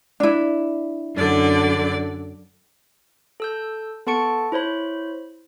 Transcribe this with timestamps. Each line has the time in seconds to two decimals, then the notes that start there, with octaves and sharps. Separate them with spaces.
0.20 D4 E4
1.16 F#2 D3 D5
3.40 A4 E6 G6
4.07 B3 A4 A5 C#6 C#7 D7
4.52 E4 C5 C#5 B5